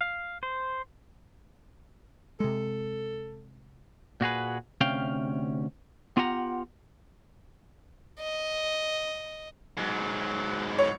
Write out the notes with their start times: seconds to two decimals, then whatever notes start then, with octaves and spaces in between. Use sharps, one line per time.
0.01 F5
0.43 C5
2.40 C3 G#3 A4
4.21 A#2 F#4 G#4 B4
4.81 D2 C3 C#4 F5 G5
6.17 B3 F4 G4 F#5 A#5
8.19 D#5
9.78 G#2 F#3
10.78 C#5